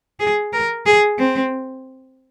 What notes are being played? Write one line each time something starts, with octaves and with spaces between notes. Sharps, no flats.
G#4
A#4
G#4
C4